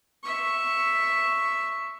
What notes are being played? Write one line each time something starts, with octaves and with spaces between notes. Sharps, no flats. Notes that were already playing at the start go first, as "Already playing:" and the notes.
E5 C#6